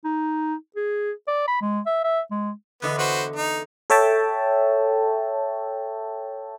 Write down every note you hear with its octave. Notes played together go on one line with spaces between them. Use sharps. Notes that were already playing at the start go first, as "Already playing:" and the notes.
D#4
G#4
D5
B5
G#3
E5
E5
G#3
E2 D3 B3 D#5
F#4 B4 C5
D#4
A4 C#5 E5 G5 A5